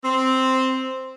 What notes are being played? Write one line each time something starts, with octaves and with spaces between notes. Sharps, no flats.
C4